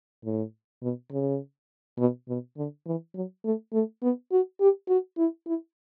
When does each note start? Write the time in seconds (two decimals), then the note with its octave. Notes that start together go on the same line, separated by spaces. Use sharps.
0.25 A2
0.83 B2
1.12 C#3
1.99 B2
2.29 B2
2.57 D3
2.86 E3
3.15 F#3
3.44 A3
3.73 A3
4.02 B3
4.32 F#4
4.61 G4
4.89 F#4
5.18 E4
5.47 E4